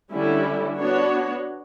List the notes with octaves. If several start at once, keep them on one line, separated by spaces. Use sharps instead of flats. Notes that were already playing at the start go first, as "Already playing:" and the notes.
D3 G3 C#4 E4
B3 D4 F#4 C#5